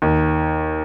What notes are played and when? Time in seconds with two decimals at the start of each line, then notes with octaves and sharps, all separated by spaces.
0.02 D#2